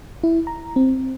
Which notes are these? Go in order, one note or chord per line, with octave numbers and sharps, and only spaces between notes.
E4
A#5
C4